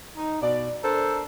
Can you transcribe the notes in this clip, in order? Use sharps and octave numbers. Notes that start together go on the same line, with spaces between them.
D#4
B2 D5
D4 A4 A#4 C5